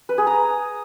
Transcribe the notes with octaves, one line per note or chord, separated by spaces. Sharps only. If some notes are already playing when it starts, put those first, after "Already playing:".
B4
G#4
A#5